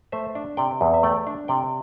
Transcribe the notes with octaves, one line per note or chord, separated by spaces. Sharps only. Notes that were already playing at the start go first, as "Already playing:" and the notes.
A3 C5 E5
D4
C3 D5 G5
E2
E5
A3 D5 G5
D4
C3 D5 G5